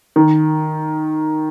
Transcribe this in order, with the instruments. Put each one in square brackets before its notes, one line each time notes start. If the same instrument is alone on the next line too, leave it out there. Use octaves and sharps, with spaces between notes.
[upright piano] D#3